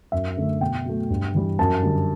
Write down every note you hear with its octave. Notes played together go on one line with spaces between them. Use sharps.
F#2 E5
D3 A3
B2 G5
F#3 A3
G2
E3 G3
F#2 A5
D3 G3